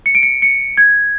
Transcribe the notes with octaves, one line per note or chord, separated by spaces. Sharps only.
C#7
D7
C#7
C#7
G#6